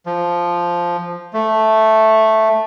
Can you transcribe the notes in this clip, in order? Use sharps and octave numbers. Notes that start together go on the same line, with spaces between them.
F3
A3